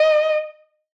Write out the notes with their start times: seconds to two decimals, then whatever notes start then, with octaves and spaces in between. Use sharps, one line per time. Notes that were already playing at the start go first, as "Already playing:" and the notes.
Already playing: D#5